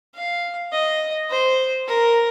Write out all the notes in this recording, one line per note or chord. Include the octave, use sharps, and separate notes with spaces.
F5
D#5
C5
A#4